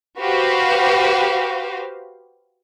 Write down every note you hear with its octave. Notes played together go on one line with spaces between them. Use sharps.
F#4 G4 B4 C5 F5